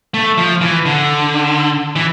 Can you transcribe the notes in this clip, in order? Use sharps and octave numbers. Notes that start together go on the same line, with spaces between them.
A3
F3
E3
D3
E3